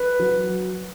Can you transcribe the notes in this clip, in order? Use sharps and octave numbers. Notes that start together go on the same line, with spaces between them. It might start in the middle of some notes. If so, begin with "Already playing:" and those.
Already playing: B4
F#3